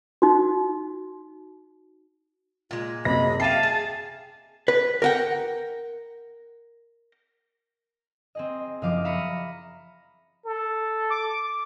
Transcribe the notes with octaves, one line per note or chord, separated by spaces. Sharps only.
D#4 F#4
A#2 G#3 F4
F#1 C3 D#5 B5 A#6
G4 E5 F5 A5 C7 D#7
G#4
B4
A#4 F#5 G5
C4 G#4 D#5
F#1 F3 D#5 F5 D6
E5 F5 A#5 B5 C#7 D#7
A4
D6